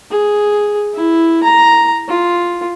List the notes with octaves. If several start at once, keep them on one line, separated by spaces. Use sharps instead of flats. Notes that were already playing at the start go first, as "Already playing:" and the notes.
G#4
E4
A#5
F4